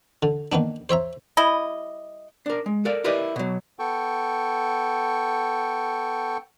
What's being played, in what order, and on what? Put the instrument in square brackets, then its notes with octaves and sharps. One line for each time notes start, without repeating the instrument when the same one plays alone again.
[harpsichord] D3
D#3 A#3 B3 D4
C5 C#5 E5 A#5
[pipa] G3 E4 D#5
[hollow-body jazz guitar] D4 A#4
G#3
A4 A#4 D5 F5
E4 G4 A#4 B4 D5 D#5
B2 F#3
[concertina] B3 A4 G5 C#6